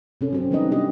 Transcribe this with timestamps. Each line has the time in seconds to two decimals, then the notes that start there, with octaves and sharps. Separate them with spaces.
0.21 C3 C#4 A4
0.33 F#3 C4 C#4
0.51 E3 G3 B3 D#4 B4 D#5
0.71 C3 D4 G4 D#5